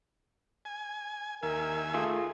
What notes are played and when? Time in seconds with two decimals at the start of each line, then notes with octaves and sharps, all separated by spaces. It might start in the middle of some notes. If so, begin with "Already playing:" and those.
0.65 G#5
1.43 D#2 A#4 E5 G#5
1.94 A3 F4 G#4